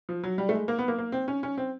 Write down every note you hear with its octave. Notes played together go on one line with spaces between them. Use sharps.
F3
F#3
G3
A3
G#3
A#3
B3
A#3
A#3
C4
C#4
C#4
C4